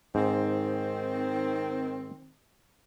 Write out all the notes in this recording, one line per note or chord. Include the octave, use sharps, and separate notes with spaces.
G#2 D#3 C4